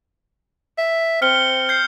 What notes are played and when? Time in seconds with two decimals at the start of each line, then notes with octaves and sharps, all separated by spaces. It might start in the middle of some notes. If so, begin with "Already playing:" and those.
0.78 E5
1.22 C4 F6 C#7 G7
1.69 G6 C7